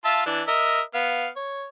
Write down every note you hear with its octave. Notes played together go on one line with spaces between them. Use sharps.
F4 E5 A5
E3 D4
A#4 D#5 E5
B3 F5
C#5